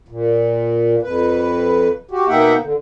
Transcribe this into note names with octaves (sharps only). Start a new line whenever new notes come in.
A#2
F2 B4
F#4 G4
B2 A#3 D#4 E5 F#5 G5
D3